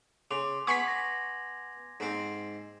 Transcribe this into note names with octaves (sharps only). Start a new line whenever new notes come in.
C#3 C6 D6 F7
B3 G#5 B5 C#6 G#6 B6
A#6
G#2 C4